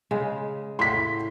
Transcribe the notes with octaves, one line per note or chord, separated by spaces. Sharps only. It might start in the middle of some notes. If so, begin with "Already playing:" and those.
C#3 G#3
A2 C6 B6